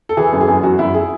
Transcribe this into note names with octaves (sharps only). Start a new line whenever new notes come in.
A4
E3 G#4
F#2
G#4
F#2
F#2 F#4
F#2 E4
G#4